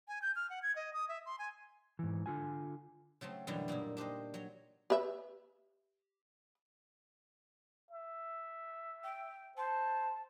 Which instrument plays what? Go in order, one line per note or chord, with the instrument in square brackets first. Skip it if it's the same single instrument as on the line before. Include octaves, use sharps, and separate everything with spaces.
[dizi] G#5
G6
F6
F#5
G#6
D#5
D#6
E5
C6
G#5
[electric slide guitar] G#2 E3
D3 F4 G#5
[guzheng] C#3 F#3 A3 C4
F#2 B2 D3 E3 F#3 G3
A#2 A#3 D#4 E4
D4 G4 C5 D#5
F#3 C#5
[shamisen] G4 B4 E5
[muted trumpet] E5
[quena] G5
[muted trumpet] C5 [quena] A5